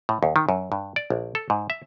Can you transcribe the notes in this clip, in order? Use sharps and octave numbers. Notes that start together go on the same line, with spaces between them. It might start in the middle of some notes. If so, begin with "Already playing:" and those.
A2
D#2
D#3
F#2
G2
D5
A#1
A4
G#2
E5